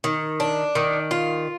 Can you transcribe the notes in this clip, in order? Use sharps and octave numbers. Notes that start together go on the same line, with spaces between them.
D#3
D4
D#3
F4